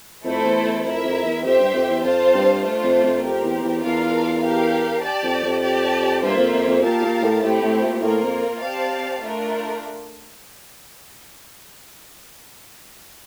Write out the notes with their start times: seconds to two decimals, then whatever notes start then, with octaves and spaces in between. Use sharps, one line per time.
0.24 F2 A3 E4 A4 C5
0.44 E2
0.64 E2
0.84 F2 E4 A#4 E5
1.04 F2
1.24 E2
1.44 F2 G4 C5 E5 G5
1.59 G2
1.74 F2
1.88 E2
2.03 F2 C4 F4 C5 F5 A5
2.34 G2
2.63 A3 D4 F4 C5
2.83 F2
3.03 F2
3.23 F2 C4 G4 A#4
3.43 E2
3.63 E2
3.83 E2 D4 F4 A#4 F5
4.43 D4 G4 A#4 F5
5.03 G4 D5 A5
5.23 F2
5.43 F2
5.62 G4 D5 A5
6.23 G2 A#3 F4 C5 E5
6.37 F2
6.52 F2
6.67 F2
6.82 A#2 G4 A#4 F5 A5
7.02 A#2
7.22 A2
7.42 A2 A3 C4 E4 G4
7.62 A2
7.81 A#2
8.01 A2 A#3 F4 A#4
8.22 F2
8.61 C4 G4 D5 F5 A5
9.21 A3 D4 F4 A#4